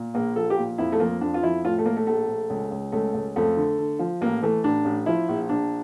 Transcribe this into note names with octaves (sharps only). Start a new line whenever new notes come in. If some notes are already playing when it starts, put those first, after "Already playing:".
Already playing: A#2
A#1 A#3
F3 A4
G4
A#2
F2 E4
A3
F3 A#3
F2 D4
F4
F3 E4
A2 F4
A3
A2 A#3
A3
A#1 A3
A#1
C#2
C#2
C#2 A3
C#2
F2 A3
D3
D3
F3
A1 A#3
E3 A3
A1 D4
A1
F3 E4
A#1
A#1 D4